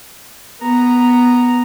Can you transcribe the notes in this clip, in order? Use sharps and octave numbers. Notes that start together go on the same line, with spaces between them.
B3 A#5